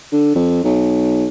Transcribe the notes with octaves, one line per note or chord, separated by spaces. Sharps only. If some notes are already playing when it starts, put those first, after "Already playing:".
D3
F2
B1